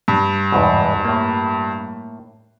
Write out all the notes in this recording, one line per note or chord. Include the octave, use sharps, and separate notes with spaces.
G2
E2 G#2 B2
A2 A#3